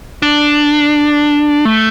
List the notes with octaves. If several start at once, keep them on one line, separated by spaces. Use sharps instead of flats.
D4
A3